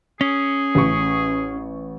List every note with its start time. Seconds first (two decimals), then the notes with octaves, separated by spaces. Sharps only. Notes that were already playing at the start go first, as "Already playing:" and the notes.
0.21 C#4 G#4
0.75 A1 C#6